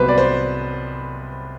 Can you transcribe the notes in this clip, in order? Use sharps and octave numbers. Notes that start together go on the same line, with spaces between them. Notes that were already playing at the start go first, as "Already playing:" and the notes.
Already playing: C2 B2 F#3 B4 C5
D5
C5